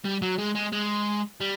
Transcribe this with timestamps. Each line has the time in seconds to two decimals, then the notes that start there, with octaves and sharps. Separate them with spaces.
0.05 G3
0.22 F#3
0.39 G#3
0.56 G#3
0.73 G#3
1.41 G3